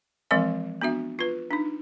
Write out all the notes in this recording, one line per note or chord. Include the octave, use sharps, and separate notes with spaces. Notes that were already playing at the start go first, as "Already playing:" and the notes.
E3 F3 G#3 C4 A#4 D#5
B3 D4 F#4 E5
F4 B4
D4 D#4